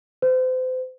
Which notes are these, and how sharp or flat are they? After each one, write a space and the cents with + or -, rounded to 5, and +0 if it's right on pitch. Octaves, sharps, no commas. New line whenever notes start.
C5 -35